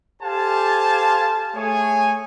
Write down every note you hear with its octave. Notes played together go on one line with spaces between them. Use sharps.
G4 A4 C5 F5 G#5 A5
A3 G#4 C#5 G#5